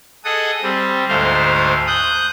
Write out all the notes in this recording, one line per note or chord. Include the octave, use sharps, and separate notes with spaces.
G#4 A4 D#5 F#5 D#6
G3 C4
D2 G#2 A3 C5 F5
D#6 F#6 G6